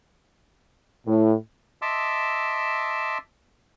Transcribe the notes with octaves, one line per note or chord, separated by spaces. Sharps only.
A2
D#5 E5 A5 C6 D6 E6